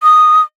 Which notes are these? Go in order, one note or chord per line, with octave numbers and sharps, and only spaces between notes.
D#6